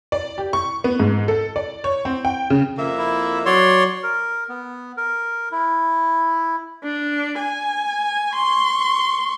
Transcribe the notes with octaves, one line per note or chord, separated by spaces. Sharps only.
D5
G4
C#6
B3
G#2
A4
D5
C#5
C4
G5
C#3
F2 A#3 E5
E4
F#3 C#5 D5 C6
A#4
B3
A#4
E4
D4
G#5
C6 C#6